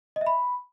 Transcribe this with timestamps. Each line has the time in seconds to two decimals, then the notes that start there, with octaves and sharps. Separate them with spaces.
0.16 D#5
0.21 E5
0.27 B5